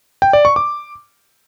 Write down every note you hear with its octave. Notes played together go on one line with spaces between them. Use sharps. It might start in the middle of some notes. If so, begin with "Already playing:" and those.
G5
D5
C#6
D6